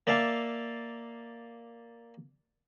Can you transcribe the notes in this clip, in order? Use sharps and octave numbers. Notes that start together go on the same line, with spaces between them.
A#3 D5 E5 F5 A5